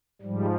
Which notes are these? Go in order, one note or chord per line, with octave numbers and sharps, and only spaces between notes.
G#2 F3 G3